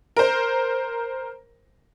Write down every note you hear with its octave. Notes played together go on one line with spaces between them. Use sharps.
A#4 C5